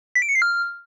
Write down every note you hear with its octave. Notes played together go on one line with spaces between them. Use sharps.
B6
D7
C#7
C7
F6